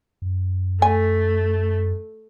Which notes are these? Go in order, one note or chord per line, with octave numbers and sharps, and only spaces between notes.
F#2
A3 G#5